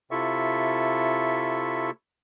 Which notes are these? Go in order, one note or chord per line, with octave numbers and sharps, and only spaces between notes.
C3 E4 F4 A4 E5 C#6